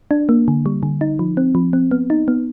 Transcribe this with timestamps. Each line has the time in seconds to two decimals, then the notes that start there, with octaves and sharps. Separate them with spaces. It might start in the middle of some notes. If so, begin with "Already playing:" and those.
0.11 D4
0.29 A#3
0.48 D3
0.66 G3
0.83 D3
1.01 D#4
1.19 F3
1.37 C4
1.55 F3
1.73 C4
1.91 B3
2.10 D#4
2.28 B3